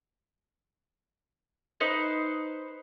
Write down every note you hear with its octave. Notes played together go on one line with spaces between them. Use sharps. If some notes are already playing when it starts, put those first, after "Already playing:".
D#4 B4 C5